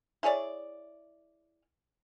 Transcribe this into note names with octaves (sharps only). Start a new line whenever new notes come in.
E4 G#4 C#5 D5